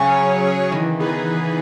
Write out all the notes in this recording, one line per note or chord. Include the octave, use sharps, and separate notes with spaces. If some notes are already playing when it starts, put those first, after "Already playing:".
Already playing: C#3 F#3 C#4 G#4 C#5
F#3
C#4 G#4 C#5
D#3 E3
B3 D#4 G#4 B4
E3